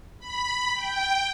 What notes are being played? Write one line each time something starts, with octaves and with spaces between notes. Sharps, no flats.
B5
G5